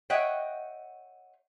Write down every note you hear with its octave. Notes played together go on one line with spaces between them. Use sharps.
C#5 D#5 E5 F#5 G5